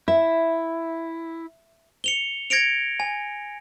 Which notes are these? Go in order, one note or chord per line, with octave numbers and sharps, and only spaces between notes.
E4 E5
C#7 F7 G7
G#6 A#6 C#7 D7 F7
G#5